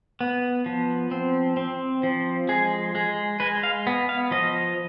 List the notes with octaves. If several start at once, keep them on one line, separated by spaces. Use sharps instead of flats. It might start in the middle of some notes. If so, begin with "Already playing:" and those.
B3
F3
C4
C4
F3
G#3 G#4
G#3 G#4
G#3 B4
F5
B3
F5
F3 D#5